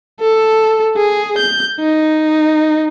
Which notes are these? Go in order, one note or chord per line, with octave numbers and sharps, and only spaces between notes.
A4
G#4
G6
D#4